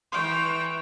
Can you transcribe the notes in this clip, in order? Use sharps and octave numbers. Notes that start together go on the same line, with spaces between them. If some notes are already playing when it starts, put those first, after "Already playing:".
E3 G5 C6 C#6